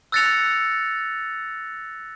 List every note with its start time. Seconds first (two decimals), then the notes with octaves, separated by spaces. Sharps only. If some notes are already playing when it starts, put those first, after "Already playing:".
0.12 E6 F#6 A6 A#6 C#7 F7